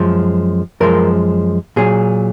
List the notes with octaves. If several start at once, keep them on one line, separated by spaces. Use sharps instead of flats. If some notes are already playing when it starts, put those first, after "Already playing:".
Already playing: F#2 F3 G#3
F#2 F3 G#3 A#4
A#2 F#3 G#4